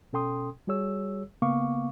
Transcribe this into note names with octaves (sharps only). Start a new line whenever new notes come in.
B2 C#4 A4 G5 C6 D#6
G3 F#4 G#4 C#5 E6
C#3 A#3 B3 F5 C#6 D6